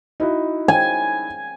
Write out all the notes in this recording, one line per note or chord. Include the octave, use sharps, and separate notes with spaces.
D#4 E4 F#4
G#5